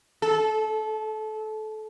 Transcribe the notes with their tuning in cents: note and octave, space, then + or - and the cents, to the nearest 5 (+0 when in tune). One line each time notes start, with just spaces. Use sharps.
A4 -25